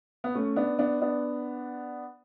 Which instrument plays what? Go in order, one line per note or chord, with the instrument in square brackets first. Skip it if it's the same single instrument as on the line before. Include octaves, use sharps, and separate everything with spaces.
[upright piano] B3
A3 C#4
B3 D4
B3 D4
B3 D4